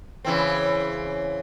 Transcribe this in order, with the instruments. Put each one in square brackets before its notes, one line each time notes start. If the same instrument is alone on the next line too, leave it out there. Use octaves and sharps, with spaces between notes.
[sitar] C#3 E3 C4